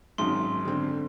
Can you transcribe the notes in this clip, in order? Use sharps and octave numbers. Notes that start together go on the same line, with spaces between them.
G#1 F#2 D#4 C6
D3 C4